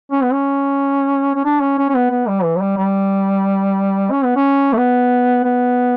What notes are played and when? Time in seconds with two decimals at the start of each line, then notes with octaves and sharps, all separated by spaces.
0.12 C#4
0.23 B3
0.33 C#4
1.35 C#4
1.45 D4
1.61 C#4
1.78 C#4
1.89 C#4
1.95 B3
2.11 B3
2.28 G3
2.44 E3
2.56 F#3
2.61 G3
2.78 G3
4.12 C#4
4.24 B3
4.36 C#4
4.73 A3
4.77 B3
5.44 B3